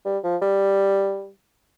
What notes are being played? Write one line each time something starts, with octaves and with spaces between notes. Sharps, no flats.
G3
F3
G3